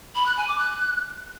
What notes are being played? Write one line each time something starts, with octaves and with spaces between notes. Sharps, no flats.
B5
F#6
G#5
D6
F#6